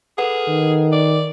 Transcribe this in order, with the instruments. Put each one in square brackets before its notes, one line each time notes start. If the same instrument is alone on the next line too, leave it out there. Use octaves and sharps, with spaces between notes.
[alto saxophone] G#4 [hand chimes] A4 B4 F#5
[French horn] D#3
[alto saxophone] D5